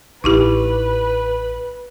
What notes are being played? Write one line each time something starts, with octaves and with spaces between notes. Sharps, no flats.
A1 D#4 E4 G4 B4